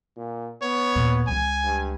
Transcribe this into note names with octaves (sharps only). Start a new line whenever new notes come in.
A#2
B3 C#5
D#2 A#2
C#2 D#3 G#5
G2